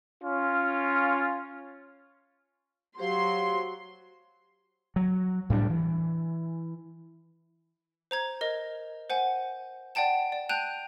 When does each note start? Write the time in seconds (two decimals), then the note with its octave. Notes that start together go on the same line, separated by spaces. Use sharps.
0.23 C#4 F4
2.99 F#3 G4 C5 F5 C6
4.96 F#3
5.50 A2 G3 C4 D4
5.70 E3
8.11 C5 A#5 G#6
8.41 A#4 D#5
9.10 C5 F#5 G#5
9.95 D5 F#5 G5 A5 E7
10.32 D5
10.49 G5 A5 F#6 G6 D#7 F7